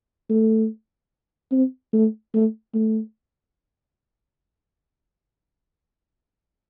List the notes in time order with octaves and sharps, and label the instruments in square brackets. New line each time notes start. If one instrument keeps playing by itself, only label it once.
[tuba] A3
C4
A3
A3
A3